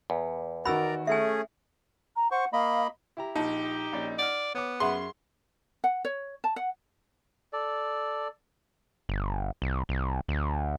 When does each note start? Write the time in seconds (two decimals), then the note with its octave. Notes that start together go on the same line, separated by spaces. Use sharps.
0.10 E2
0.65 D#3 F#4 A#4 D5 A#5 B5 E6
1.07 A3 C#4 G#4 E5 G#5
2.16 A#5
2.31 C5 F#5 C#6
2.53 A#3 D#5 F5 B5
3.17 E4 G4 A#5
3.36 A#1 A#2 D#4 G4 A5
3.93 A#1 C#4 D5
4.19 D5 F#5 F6
4.55 B3 C#5 D6
4.80 F#2 G#4 E5 F#5 B5 C6
5.84 F#5
6.05 C#5
6.44 A5
6.56 F#5
7.53 A4 D5
9.09 G1
9.62 C2
9.89 C2
10.28 D2